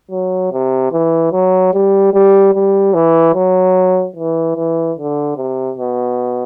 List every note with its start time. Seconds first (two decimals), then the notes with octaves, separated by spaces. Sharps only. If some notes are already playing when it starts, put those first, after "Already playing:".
0.11 F#3
0.52 C3
0.92 E3
1.32 F#3
1.73 G3
2.13 G3
2.54 G3
2.94 E3
3.34 F#3
4.16 E3
4.56 E3
4.97 D3
5.37 C3
5.78 B2